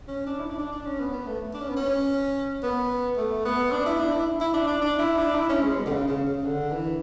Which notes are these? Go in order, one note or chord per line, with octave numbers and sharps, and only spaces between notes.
C#4
D4
E4
D4
D4
D4
C#4
B3
B3
A3
D4
C#4
B3
C#4
B3
A3
B3
D4
E4
D4
E4
E4
D4
D4
D4
E4
D4
E4
C#4
G#3
B2
D3
C#3
C#3
C#3
D3
E3